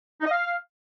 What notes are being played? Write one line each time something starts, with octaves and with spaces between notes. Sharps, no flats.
D#4
D#5
F5